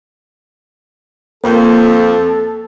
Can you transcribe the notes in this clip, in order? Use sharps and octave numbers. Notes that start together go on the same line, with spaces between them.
F2 A#3 A4